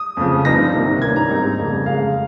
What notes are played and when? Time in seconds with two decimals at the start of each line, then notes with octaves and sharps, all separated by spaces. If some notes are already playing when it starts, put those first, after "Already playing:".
Already playing: D#6
0.17 F2 C#3 F3
0.45 G2 F3 C4 D#4 A#6
0.73 C2 C3 D#3 A#3
1.02 G2 D#3 A#3 C#4 G#6
1.16 A#5
1.30 G#2 G3 C4 D#4
1.59 F2 C#3 G3 A#3
1.86 F2 C#3 G#3 F5